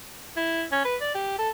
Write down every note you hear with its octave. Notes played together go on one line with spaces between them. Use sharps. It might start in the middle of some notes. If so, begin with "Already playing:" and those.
E4
C#4
B4
D5
G4
A4